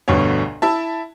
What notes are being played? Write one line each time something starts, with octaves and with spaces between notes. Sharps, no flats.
G1 D2 G2 B2 C#5
E4 E5 A5